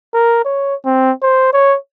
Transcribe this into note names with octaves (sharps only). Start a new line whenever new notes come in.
A#4
C#5
C4
C5
C#5